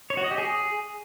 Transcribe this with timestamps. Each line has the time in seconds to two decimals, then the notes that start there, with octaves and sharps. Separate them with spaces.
0.10 C#5
0.17 F#4
0.24 D#5
0.31 G4
0.38 G#4